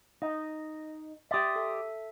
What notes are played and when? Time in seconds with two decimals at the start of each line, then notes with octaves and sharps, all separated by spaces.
0.22 D#4 D#5
1.31 G4 D5 E5 C6 D#6
1.56 A4 E5